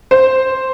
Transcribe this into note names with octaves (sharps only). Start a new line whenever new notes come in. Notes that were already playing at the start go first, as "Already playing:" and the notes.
C5